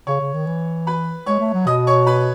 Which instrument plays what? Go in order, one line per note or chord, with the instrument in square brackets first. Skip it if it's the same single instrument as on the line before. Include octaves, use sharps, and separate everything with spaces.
[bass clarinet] C#3 [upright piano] C#5 C#6
[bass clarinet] C#3
D#3
E3
[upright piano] B4 B5
[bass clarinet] G#3 [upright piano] C#5 C#6
[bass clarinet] A3
F#3
[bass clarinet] B2 [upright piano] D#5 D#6
[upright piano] C#5 C#6
B4 B5